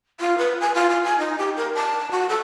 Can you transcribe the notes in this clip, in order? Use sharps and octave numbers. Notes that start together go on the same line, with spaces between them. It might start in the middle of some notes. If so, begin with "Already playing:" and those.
F4
B4
G#5
F4
F4
G#5
D#4
G4
A#4
A5
F#4
A4